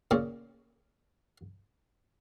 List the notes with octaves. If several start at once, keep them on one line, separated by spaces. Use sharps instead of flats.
A#2 C#3